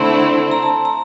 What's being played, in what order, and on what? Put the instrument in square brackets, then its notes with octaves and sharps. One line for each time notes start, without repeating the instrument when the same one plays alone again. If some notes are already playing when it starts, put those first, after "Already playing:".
Already playing: [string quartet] D3 A3 C4 E4 [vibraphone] C6
[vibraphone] A#5
A5
A#5